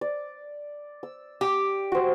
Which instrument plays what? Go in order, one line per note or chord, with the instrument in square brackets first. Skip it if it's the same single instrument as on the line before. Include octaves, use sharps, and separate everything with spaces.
[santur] D5
E6
[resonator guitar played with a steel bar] G4
[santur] F#4 C5